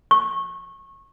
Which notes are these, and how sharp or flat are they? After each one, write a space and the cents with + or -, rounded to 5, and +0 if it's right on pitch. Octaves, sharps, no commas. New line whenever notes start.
C#6 -25